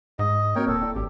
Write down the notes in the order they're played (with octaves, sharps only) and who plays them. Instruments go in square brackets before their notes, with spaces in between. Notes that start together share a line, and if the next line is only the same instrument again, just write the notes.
[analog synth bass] G#2 [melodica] D#5
[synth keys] A#3 C4 F#4 [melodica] A#4 C#5 G5
[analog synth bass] D#1 [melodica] A4
[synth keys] E4 D5 G5
[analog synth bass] A1 [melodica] G4